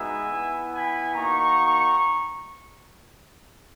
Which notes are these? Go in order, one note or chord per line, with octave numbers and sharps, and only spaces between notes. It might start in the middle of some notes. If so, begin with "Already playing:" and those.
Already playing: G#3 B3 D#4 F#4 E5 G#5
B3 E4
G#5 B5
A#3 D#4 F#4 A#5 C#6